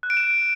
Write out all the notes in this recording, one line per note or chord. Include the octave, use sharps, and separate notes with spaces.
F#6
D7
E7